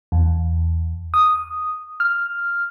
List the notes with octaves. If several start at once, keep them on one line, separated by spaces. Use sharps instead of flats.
E2
D#6
F6